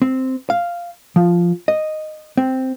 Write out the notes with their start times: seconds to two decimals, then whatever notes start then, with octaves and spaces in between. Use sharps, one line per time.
0.02 C4
0.50 F5
1.16 F3
1.68 D#5
2.37 C4